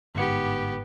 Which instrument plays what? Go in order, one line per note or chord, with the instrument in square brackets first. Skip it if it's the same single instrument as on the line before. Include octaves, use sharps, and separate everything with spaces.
[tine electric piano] G1 G#2 C#7 [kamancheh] B3 G4